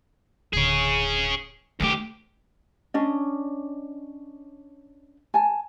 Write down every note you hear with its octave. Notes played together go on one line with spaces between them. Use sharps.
D1 D3 G#4 C#5
D2 D#3 A3 G4
C#4 D4 D#5
G#5 A5